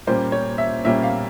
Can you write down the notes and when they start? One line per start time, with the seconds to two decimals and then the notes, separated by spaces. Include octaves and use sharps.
0.07 A#2 G3 A#3 C#4 C5
0.32 C#5
0.58 E5
0.85 A#2 G3 A#3 C#4 E5
1.03 F5